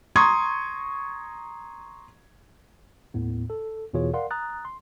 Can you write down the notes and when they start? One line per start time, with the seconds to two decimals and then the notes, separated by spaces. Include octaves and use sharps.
0.16 A#5 C6 C#6 D#6 G#6
3.14 D#2 A2 B3
3.50 A4
3.93 E2 B2 E3 F4 G#4 C#5
4.13 A#4 D5 F5 F#5 C6
4.31 A#5 D#6 F#6 A6
4.65 C6